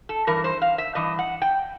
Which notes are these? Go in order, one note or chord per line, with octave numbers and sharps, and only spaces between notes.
A4
G2 E3 A#4
C5
F5
E5
G2 E3 D#5
F#5
G5